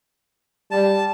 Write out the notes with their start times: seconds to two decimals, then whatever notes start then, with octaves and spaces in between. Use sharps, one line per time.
0.71 G3 A5